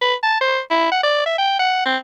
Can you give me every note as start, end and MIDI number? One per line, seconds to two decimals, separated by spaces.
0.01 0.14 71
0.23 0.38 81
0.41 0.60 72
0.70 0.88 64
0.92 1.00 78
1.03 1.24 74
1.26 1.35 76
1.38 1.57 79
1.59 1.83 78
1.85 1.97 60